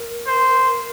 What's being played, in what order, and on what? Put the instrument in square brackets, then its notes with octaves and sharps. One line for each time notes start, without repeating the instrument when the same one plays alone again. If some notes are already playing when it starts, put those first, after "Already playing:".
Already playing: [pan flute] A#4
[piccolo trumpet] C5